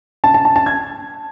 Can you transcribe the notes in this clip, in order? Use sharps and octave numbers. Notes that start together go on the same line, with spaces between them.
A5
A5
A5
A5
G#6